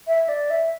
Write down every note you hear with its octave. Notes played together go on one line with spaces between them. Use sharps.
E5
D5
E5